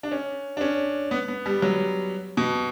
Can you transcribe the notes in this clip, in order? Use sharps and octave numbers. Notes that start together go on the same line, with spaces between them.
D4
C#4
D4
C#4
B3
B3
G3
F#3
B2